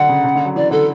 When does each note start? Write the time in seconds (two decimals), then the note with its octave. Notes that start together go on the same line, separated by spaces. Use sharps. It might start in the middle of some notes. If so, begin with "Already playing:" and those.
Already playing: D3 F#3 F#5
0.09 C#3
0.24 C#3
0.35 D3
0.45 F#3
0.56 E3 D5
0.71 D3 A4